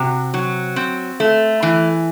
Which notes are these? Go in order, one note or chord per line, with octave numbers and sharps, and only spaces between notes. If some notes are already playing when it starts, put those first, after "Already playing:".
Already playing: C3 F#4
F#3
C4
A3
E3